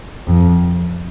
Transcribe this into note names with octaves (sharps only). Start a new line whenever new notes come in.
F2